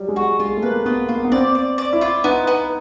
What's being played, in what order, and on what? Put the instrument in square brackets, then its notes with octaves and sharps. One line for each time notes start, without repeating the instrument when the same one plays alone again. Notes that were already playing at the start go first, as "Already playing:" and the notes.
Already playing: [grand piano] F#3 G3
G#3
[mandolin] F#4
[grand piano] G#3 [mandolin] F4
[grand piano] A3
[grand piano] A#3 [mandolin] B4
[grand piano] B3 [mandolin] F4
[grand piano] A#3 [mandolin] F4
[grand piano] B3
[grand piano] C4 [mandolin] D5
[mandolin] D5
D5
[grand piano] E4
[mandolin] F4
[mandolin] B3 [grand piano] D#4
[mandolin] B3